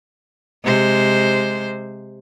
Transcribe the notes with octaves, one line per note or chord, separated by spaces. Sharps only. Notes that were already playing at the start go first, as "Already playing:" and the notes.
C3 G#3 C5